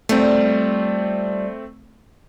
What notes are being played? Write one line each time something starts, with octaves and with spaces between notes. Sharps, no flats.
G3 A3 C4 F4